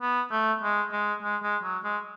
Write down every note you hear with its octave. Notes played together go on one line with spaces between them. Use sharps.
B3
A3
G#3
G#3
G#3
G#3
F#3
G#3